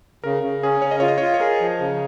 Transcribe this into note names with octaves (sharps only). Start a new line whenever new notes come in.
C#3 A#4
C#3
C#4 G#4
C#3 C#5
D#5
F4 C#5
D#5
C#5
F4
C#5
G#4 A#4
F3
C#3